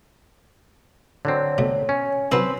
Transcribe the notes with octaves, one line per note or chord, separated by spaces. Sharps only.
D3 F#3 C4 C#5
B2 A3
C#4
D#3 F#3 C4 B4